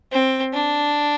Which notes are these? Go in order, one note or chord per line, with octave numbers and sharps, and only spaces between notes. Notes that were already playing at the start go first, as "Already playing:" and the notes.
C4
D4